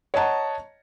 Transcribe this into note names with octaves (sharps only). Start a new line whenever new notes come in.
C#5 D#5 F#5 A5 A#5